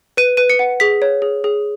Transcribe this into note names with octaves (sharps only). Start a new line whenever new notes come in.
B4 D#7
B4 D#7
C#7
F#5
G#4 B6
C#5
G#4
G#4